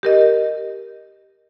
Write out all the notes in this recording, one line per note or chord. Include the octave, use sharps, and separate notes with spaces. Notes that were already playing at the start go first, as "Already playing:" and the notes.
G4 A#4 D#5